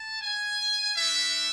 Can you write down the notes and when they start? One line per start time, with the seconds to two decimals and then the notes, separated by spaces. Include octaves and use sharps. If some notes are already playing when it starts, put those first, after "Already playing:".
Already playing: A5
0.22 G#5
0.96 A3 D4 F#4 E5